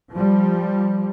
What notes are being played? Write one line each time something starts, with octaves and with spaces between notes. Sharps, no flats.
F3 G3